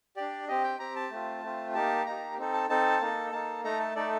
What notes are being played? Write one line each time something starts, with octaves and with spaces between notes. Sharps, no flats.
D4 G4 D5
C4 G4 D#5
G5
C4 G4 A#5
A5
A3 C4 F4
A3 C4 F4
A#3 D#4 G4 A5
A#3 D#4 G4 A#5
C4 D#4 A4
A5
C4 D#4 A4 A5
A#3 D#4 A4
A#3 D#4 A4 A5
A3 D#4 A4 A#5
A5
A3 D#4 A4 D5